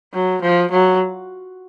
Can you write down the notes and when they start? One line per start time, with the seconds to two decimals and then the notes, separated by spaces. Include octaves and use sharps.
0.13 F#3
0.42 F3
0.71 F#3